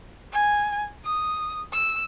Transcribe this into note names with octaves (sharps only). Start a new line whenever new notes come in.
G#5
D#6
E6